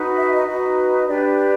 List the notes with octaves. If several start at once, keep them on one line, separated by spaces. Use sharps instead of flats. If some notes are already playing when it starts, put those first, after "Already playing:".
Already playing: D#4 F#4 B4
E5
D#5
D#4 F#4 B4 D#5
D4 G4 B4 D5